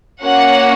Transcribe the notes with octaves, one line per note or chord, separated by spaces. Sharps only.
A#3 C#4 F#4 F#5